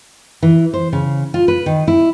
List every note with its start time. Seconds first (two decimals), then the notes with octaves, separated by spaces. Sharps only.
0.42 E3
0.73 C5
0.93 C#3
1.34 F4
1.48 B4
1.66 D#3
1.88 E4